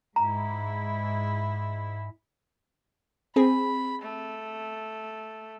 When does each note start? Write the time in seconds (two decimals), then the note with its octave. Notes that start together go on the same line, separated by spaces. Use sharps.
0.16 G#2 E4 A#5
3.36 C4 G#4 B5
4.03 A3